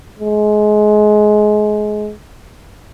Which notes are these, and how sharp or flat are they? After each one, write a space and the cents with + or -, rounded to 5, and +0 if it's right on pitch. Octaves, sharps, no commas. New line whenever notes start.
G#3 +25